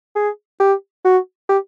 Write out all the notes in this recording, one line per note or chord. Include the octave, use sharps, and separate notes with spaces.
G#4
G4
F#4
G4